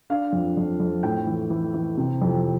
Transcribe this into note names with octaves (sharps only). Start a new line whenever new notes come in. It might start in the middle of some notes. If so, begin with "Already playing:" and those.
D4 F5
F2
F2
F2
A2 G5
E3
E3
E3
C3
F2